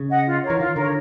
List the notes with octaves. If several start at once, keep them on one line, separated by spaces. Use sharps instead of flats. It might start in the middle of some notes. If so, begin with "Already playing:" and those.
Already playing: C#3
D#5 F#5
F4
A#4 C#5
E3
D#3 F4
D3 A#4 C#5